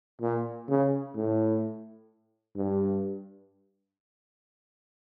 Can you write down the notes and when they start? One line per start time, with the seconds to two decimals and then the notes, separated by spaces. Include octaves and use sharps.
0.21 A#2
0.70 C#3
1.16 A2
2.56 G2